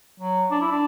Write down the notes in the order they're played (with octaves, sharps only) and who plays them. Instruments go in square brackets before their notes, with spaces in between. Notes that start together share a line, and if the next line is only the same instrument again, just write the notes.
[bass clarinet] F#3
D4
E4
D4